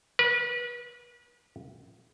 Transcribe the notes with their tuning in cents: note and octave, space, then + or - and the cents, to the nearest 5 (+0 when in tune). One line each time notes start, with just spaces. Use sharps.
B4 -35